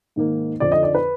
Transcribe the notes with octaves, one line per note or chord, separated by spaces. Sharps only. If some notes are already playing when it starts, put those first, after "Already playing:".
G#2 D#3 A#3
F2 D3 F3 D5
D#5
D5
B4